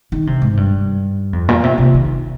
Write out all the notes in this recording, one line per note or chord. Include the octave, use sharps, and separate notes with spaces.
D#3
C3
G#2
G2
F2
A#2
C3
C3
D#3